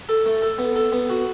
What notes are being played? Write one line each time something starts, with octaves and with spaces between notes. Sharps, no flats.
A4
A3
A4
B3
A4
B3
F#4